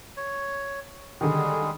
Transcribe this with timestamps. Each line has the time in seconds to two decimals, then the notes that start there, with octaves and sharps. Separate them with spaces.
0.17 C#5
1.21 D3 D#3 G3 G#3 G#4